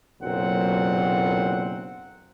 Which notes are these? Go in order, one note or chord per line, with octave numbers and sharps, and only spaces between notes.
F#1 B1 A#2 F#3 C4 F#5